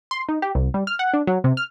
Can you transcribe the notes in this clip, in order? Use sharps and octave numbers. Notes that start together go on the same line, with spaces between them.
C6
D#4
G4
C2
G3
F6
F#5
D4
F#3
C3
F6